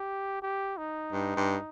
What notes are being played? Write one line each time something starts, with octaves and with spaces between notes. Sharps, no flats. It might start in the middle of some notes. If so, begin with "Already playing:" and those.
Already playing: G4
G4
D#4
G2
G2